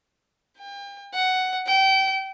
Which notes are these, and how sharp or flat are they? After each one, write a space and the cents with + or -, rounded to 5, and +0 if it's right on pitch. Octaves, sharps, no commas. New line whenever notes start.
G5 +40
F#5 +10
G5 -25